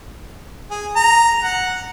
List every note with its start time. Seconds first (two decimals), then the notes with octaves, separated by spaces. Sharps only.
0.70 G#4
0.96 A#5
1.42 F#5